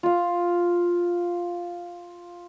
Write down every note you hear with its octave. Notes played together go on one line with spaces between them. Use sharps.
F4 F5